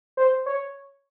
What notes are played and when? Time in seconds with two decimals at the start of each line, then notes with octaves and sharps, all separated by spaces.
0.17 C5
0.46 C#5